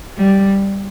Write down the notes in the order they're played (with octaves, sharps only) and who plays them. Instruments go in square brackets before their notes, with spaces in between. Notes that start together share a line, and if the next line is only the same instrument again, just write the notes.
[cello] G3